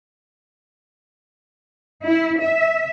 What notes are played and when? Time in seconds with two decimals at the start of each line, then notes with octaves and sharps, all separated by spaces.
2.04 E4
2.41 E5